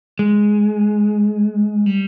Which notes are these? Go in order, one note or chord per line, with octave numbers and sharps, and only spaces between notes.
G#3
G3